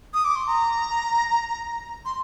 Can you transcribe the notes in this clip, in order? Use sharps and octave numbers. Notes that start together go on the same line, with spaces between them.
D#6
D6
C6
A#5
C6